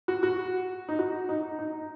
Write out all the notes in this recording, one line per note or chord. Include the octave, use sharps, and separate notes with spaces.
F#4
F#4
D#4
F#4
D#4
D#4